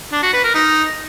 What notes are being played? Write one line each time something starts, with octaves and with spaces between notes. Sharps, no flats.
D4
F#4
B4
A#4
D#4